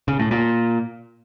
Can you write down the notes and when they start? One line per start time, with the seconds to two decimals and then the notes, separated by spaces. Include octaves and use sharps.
0.08 C#3
0.19 A2
0.31 A#2